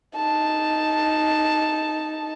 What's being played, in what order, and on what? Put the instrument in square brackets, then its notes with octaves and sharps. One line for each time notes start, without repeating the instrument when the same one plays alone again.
[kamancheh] D#4 A5